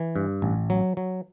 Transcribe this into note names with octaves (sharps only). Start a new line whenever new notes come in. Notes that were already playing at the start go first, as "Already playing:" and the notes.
Already playing: E3
G2
A1
F#3
F#3